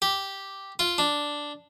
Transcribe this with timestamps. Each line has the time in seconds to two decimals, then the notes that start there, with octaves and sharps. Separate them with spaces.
0.02 G4
0.79 F4
0.98 D4